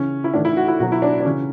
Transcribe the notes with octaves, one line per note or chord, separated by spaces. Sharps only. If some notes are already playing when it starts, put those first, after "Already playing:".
Already playing: C#3 E3 C#4
E4
A2 E3 D4
E4
F#4
E4
B2 F#3 F#4
E4
D4
D4
C#3 E3 C#4